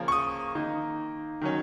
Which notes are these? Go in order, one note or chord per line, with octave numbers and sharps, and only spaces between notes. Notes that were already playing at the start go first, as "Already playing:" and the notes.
Already playing: C#3 F3 A#3 C#4
C#6
D#6
D#3 A#3 D#4
D#3 F#3 C#4